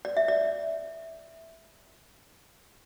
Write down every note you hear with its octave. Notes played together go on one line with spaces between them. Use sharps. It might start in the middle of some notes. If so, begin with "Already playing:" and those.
D5
E5
D5